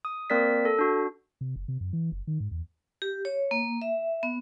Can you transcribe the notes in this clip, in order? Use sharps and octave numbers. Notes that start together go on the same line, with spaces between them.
D#6
A#3 C4 A#4 D5 B6
A4
D4 F#4
C3
F#1
C3
F#2
E3
F#1
D#3
G#2
E2
G4
C#5
A#3
E5
B3